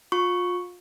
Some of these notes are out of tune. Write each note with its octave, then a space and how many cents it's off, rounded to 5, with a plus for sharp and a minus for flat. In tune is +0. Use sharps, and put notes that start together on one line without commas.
F4 +30 C#6 +0